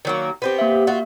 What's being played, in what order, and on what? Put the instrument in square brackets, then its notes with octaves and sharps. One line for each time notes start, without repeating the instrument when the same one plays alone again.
[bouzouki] D#3 F#3 A#3
B3 C4 G4
[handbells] A#3 E5
[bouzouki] F4 F#4